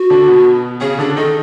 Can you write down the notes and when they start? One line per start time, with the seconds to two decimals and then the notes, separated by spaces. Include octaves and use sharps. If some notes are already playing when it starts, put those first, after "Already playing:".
Already playing: F#4
0.10 D3 D4
0.28 B2 B3
0.81 C#3 C#4 G#4
0.98 D3 D4 G#4
1.16 D#3 D#4 A4